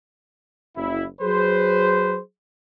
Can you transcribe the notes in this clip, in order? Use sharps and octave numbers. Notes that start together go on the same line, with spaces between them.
F#1 E4
F#3 G#4 B4 C5